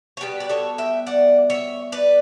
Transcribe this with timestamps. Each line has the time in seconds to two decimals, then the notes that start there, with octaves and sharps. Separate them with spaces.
0.17 C#5
0.21 B2 G3 B3 G4 B4
0.40 D5
0.49 A4 C#5
0.78 E5 G5
1.06 D5 F#5
1.50 C#5 E5
1.92 B4 D5